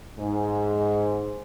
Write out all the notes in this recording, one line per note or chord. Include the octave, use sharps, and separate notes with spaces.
G#2